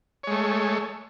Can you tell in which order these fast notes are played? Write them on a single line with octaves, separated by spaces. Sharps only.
C#5 G#3 A3